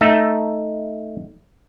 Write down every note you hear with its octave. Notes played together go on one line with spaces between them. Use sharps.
A3 D#4 E5